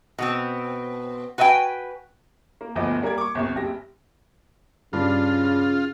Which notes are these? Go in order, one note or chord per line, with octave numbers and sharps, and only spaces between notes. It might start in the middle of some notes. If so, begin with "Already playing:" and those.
B2 B3 C4
F#4 B4 D#5 E5 G5 G#5
A#3
G1 D2 F3 B3 D#5 D6
G3 A#3 A#4 D5 G#6
C#6 D6
G1 C2 C#6
F#1 G4 A#6
G2 C#3 D4 F4